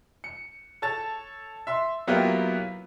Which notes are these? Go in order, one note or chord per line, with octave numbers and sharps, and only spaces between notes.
C#7
A4 C#5 A5 A6
E5 C6
F#3 A#3 B3 E4 F4 G4